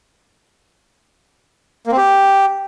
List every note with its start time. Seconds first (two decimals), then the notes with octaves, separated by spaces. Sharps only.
1.87 A#3
1.92 C4
1.97 G4